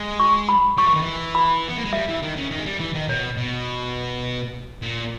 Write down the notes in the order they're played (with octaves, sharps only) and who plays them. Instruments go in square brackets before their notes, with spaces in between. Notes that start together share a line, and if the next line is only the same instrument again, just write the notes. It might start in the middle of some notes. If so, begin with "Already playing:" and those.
Already playing: [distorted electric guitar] G#3
[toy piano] C#6
B5
[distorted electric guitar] G3 [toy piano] C#6
[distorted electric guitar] E3
D#3
E3
[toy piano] B5
[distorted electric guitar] B3
A#3
G#3
[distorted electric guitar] G3 [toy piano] E5
[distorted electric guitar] E3
D#3
C#3
D#3
G#3
G3
E3
D#3
[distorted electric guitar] B2 [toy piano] C#5
[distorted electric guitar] B2
A#2